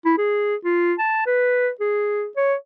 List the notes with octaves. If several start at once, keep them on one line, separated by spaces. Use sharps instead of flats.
E4
G#4
F4
A5
B4
G#4
C#5